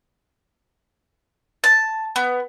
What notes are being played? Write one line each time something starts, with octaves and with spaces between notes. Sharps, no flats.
A5
B3